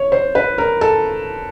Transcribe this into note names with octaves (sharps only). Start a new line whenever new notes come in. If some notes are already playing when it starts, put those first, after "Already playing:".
Already playing: C#5
C5
B4
A#4
A4